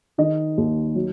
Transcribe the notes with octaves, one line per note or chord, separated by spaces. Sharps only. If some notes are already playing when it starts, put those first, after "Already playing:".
D#3 D#4 D#5
D#2
F#3